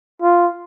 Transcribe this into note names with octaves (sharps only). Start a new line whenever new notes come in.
F4